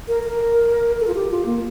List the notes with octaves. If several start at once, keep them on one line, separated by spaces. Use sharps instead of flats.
A#4
A#4
A4
F4
G4
F4
A#3